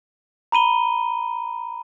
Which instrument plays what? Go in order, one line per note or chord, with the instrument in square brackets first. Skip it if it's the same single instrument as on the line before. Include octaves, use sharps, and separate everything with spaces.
[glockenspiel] A#5 B5 D#7 G7